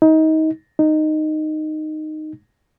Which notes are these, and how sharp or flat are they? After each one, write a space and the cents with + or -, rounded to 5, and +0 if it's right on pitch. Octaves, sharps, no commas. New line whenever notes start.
D#4 +25
D#4 -10